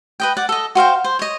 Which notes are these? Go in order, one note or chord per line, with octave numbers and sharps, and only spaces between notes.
B4 D#5 G5
D5 F#5
A4 D#5
F#4 C5 F5 G5
C5
C#5 D#5